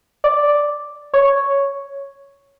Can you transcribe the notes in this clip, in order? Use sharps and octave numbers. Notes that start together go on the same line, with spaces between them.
D5
C#5